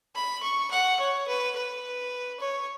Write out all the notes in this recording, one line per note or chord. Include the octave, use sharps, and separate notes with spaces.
B5
C#6
F#5
C#5
B4
B4
C#5